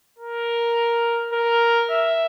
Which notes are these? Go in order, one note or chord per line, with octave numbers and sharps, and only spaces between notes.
A#4
A#4
E5